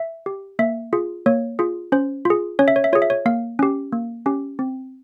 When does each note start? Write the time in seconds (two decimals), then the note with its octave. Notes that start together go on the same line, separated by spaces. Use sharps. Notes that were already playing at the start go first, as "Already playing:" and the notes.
Already playing: E5
0.26 G4
0.59 A#3 E5
0.93 F4 G#4
1.26 A#3 C#5
1.59 F4 G#4
1.92 C#4 C5
2.25 F4 G#4
2.59 C#4 C#5
2.68 E5
2.76 C#5
2.84 E5
2.93 F4 G#4 C#5
3.02 E5
3.10 C#5
3.26 A#3 F5
3.59 C#4 G4
3.92 A#3
4.26 C#4 G4
4.59 C4